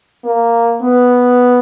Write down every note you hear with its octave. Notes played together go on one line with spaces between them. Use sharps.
A#3
B3